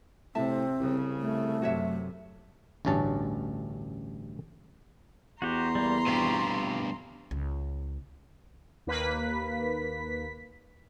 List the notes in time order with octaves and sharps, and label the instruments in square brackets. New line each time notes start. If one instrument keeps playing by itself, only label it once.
[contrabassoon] A2 [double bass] C3 [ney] C4 [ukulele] E5 A5
[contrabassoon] C2 [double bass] C#3
[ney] A3
[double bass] F#2 C3 [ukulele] F#4 C#5 E5
[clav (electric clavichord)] A1 D2 G2 C#4 A5
[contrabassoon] E2 [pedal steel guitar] F#4 G4 [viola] A#5 C6
[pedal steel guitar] G3 A#3
[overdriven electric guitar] G2 B2 [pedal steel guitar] C4 F4 G4
[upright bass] C#2
[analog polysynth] D#2 A#3 B4 B6